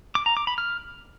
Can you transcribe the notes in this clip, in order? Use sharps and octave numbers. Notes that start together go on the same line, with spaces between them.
D6
A#5
D6
B5
F6